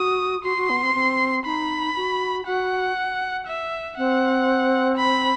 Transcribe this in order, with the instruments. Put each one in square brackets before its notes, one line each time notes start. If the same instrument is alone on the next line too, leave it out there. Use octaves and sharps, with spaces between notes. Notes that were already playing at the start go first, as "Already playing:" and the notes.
Already playing: [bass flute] F#4 [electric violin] D#6
[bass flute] F#4 [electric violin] C6
[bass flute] F#4
B3
C4
C4
[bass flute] D#4 [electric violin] B5
[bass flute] F#4
[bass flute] F#4 [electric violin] F#5
[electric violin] E5
[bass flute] C4 [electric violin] F#5
[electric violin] B5